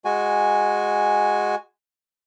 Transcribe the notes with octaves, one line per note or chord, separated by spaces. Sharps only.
G#3 F#4 G#5